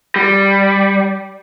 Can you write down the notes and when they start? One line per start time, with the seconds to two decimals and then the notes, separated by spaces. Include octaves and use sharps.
0.16 G3